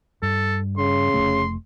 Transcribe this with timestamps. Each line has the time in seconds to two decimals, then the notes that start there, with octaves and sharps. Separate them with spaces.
0.22 G2 A4
0.78 C#3 C6
1.14 F1 F2 A3